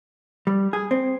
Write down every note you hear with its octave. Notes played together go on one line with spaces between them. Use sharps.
G3
G#4
C4